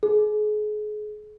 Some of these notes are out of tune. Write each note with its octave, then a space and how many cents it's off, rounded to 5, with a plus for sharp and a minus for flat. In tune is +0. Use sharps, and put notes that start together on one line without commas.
G#4 +35